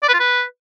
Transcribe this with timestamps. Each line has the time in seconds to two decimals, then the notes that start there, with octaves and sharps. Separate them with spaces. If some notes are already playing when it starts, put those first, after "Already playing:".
0.03 D5
0.09 B4
0.14 F4
0.19 B4